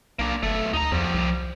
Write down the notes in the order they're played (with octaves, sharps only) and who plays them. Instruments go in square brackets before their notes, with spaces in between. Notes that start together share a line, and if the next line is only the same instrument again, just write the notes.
[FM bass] B1 [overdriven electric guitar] A#3 D4
[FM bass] F#1 [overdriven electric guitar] B1 A3
[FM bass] D2 [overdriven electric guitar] D#4 A#5
[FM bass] E2 [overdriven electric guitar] F3 G3
[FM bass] C2